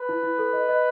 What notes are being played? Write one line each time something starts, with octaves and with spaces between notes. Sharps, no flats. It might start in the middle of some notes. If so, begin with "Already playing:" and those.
Already playing: B4
E4
E4
A4
D#5
D#5